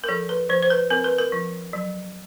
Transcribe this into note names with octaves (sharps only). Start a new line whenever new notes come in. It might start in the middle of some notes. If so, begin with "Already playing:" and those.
A#4
F3 A4
B4
F3 C5
C5
B4
C4 A#4
B4
A#4
F3
F#3